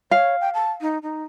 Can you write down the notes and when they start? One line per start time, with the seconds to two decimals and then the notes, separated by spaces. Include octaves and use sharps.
0.11 C#5 F5
0.41 G5
0.54 A5
0.81 D#4
1.03 D#4